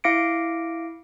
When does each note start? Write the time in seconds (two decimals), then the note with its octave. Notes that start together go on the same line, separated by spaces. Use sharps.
0.04 E4 F5 D6 A#6 C#7 D7